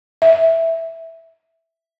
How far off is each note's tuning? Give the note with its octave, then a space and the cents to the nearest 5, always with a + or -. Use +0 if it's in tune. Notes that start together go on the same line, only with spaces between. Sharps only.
E5 -5